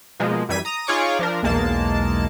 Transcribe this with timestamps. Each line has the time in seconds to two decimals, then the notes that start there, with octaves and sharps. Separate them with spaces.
0.20 B2 F3 G#3 A#3
0.49 F#2 E3 G3 G#6 B6 D#7
0.65 A#5 D#6
0.87 D#4 F4 G#4 C#5 C#6 D6
1.19 F3 D4 A#4
1.43 B1 E2 G#3 A#3 A5